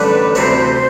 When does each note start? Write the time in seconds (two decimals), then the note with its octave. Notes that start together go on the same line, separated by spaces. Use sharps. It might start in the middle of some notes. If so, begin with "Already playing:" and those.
Already playing: A1 G2 D3 A3 D4 B4
0.35 D2 C3 E3 A3 C4 C5